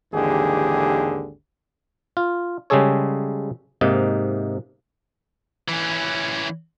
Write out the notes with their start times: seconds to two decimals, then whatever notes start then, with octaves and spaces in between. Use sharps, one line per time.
0.13 G#1 D#2 D3 E3 G4 G#4
2.17 F4
2.70 C#3 G3 G#3 G#4 A4 C#5
3.81 G#2 C3 A#3 D#4
5.68 E3 C#4